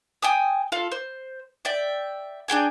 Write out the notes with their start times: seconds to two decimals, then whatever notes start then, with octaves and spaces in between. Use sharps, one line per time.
0.22 G5 G#5 D#6
0.72 F4 A4 F5
0.92 C5
1.65 D5 E5 G5
2.48 D4 G#4 G5 G#5